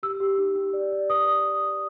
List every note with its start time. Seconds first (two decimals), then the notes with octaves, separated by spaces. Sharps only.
0.03 G4 E6
0.20 G4
0.38 D#4
0.56 G4
0.73 D5
0.92 D5
1.10 B4 D#6